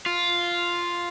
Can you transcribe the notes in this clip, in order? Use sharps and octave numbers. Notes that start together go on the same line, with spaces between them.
F4